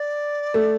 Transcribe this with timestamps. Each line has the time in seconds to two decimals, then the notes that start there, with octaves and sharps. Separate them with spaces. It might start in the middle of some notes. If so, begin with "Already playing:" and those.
Already playing: D5
0.54 A3